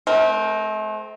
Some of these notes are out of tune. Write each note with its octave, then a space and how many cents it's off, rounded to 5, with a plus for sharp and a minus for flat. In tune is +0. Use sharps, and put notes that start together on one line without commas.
A3 -40 C4 +0 A#4 +0